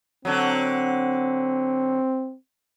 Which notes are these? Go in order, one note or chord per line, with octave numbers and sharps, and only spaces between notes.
D3 F#3 C4